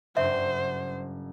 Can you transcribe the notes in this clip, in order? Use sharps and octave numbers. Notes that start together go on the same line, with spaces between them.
F#1 G2 C5 E5